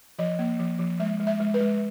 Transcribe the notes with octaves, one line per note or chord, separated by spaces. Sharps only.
F3 D#5
A#3
F3
F3
G#3 E5
G#3
E5
G#3
B4
G#3